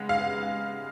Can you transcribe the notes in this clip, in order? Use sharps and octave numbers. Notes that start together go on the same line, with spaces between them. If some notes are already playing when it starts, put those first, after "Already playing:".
Already playing: C#3 G#3 B3
F5